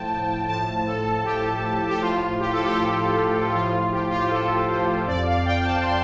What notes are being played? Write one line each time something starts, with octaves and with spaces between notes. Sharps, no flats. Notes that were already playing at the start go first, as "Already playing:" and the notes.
Already playing: A2 F3 G5 A5
A2 F3 A5
A4
G4
G4
A2 F3 F4
G4
A4
G4
A2 F3 F4
G4
F4
G4
A4
C5
F2 F3 D5
F5
G5
A5
C6